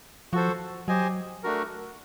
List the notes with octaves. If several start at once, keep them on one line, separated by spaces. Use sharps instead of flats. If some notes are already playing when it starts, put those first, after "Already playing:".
F3 F#4 A4 C5
F#3 G4 C5 D#5 G#5
A3 D4 F#4 A#4